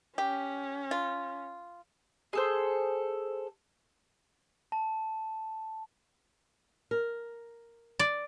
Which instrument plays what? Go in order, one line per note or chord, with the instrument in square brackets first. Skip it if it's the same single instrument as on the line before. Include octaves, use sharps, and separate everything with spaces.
[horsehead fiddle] C#4 [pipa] G4
[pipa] F4
[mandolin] G#4 A4 C5
[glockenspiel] A5
[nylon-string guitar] A#4
[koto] D5